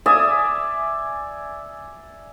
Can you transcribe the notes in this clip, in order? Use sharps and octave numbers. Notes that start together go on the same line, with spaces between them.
D5 E5 G#5 D#6